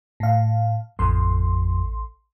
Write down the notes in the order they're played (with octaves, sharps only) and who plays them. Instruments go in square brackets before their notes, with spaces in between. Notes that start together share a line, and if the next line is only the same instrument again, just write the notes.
[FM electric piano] A2 F5
[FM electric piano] A1 C6 [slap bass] F2